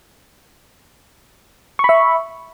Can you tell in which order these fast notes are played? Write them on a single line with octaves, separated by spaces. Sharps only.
C#6 B5 E5